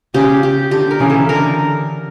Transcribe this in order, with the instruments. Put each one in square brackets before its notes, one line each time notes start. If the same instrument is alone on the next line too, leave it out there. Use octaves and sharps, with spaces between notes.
[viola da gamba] C#3 [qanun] G4
[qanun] G4
[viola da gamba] D3 [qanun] G4
[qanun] A#4
[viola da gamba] C#3 E3
[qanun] A4
[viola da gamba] D3 [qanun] A#4